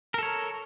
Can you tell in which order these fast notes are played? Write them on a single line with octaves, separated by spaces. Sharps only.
A#4 A4 C#5